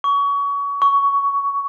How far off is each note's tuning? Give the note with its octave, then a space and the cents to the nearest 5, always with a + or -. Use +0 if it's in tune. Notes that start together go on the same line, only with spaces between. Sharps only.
C#6 +30
C#6 +15